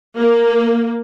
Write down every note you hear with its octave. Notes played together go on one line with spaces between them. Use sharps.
A#3